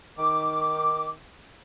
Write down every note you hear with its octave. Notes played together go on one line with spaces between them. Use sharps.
D#3 D6